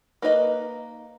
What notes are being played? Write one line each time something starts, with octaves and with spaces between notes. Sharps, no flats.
A#3 D#4 B4 C#5 D#5